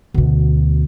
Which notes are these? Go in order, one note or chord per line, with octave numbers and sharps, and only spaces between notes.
D2 B2